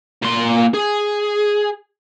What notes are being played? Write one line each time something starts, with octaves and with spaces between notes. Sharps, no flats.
A#2 C6
G#4